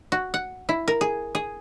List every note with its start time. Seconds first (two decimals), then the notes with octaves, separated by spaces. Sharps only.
0.12 F#4
0.34 F#5
0.69 E4
0.88 A#4
1.01 G#4
1.35 G#4